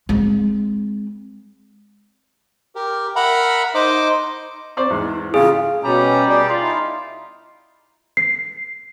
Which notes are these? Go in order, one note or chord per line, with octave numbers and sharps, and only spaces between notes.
G#3 C4
G4 A#4
A#4 E5 F#5 A#5 B5
D#4 C5 D#5 D6
C4 C5 D5 C#6
E2 G#2 E4
A1 C#3 F4 G#4 F5
B2 G3 C#4 A#5
G#4 D5
F4
D#4 E4
C7